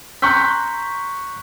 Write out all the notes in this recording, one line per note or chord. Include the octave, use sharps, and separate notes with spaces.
A#5 C6 C#6 F#6 G6 B6